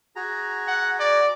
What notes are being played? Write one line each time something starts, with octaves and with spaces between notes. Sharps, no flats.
F#4 G#4 A#5
F#5
D5